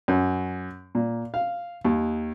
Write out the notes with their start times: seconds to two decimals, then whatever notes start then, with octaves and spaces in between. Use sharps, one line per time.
0.08 F#2
0.95 A#2
1.34 F5
1.85 D#2